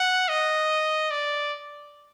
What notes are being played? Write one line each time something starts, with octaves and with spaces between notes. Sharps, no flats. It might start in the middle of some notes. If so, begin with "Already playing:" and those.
Already playing: F#5
D#5
D5